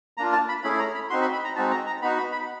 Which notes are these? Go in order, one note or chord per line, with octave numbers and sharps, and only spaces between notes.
A#3 D4 F4 A#5
A5
B5
A3 C#4 E4 G#4 B5
A#5
B5
C4 D#4 F#4 C6
B5
B5
A#5
G#3 C4 D#4 F#4 A5
A#5
A#5
B3 D#4 F#4 B5
B5
B5